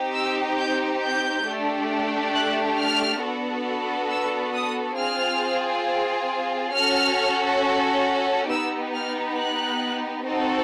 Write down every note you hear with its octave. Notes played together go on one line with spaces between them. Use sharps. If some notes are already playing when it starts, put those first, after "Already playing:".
Already playing: C4 D#4 G4
E6
G6
G6
A3 D4 G4
F#6
F6
B3 D4 F#4 A4
E6
D#6
C4 F4 G#4 F6
C#4 F#4 A4 F6
B3 D#4 G4 E6
F6
F#6
C4 D#4 F#4 A4